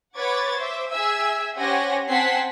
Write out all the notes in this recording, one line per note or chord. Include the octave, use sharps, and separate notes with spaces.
B4 C#5 F#5 D6 G#6 A6
C5 E5 D6
G#4 E5 G#5 E6
C#4 G4 C5 F#5 G#5 A#6
C4 F#5 G#5 A5 B6 C7